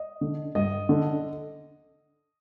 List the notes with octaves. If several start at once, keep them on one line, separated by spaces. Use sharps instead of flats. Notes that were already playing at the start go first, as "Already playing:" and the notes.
Already playing: D#5
D3
G2 D#5
D3